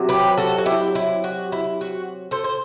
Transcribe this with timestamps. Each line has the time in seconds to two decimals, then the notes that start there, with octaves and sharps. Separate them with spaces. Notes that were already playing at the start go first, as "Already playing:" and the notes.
Already playing: C3 F#3
0.09 G4 B4
0.37 F#4 A4
0.58 F#4
0.66 E4 G4
0.95 E4
1.24 F#4
1.52 E4
1.81 F#4
2.31 A4 C5
2.44 C5